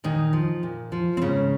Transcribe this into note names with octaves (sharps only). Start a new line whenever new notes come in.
A#2 D#3 D#4
F3
A#2
F3
C4
G#2 C#3 C#4